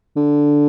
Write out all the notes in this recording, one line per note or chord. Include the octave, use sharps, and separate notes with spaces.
D3